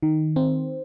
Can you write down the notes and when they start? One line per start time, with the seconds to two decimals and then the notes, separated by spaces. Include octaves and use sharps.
0.03 D#3
0.36 C4